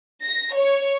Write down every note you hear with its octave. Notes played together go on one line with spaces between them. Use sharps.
A#6
C#5